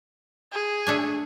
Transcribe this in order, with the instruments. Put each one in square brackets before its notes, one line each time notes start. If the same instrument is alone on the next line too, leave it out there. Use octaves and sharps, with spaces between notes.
[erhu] G#4
[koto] A3 D4 G#5